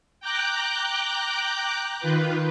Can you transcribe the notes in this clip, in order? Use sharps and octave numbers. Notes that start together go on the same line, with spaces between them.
G5 A#5 D6 F#6 G6
D#3 F4 B4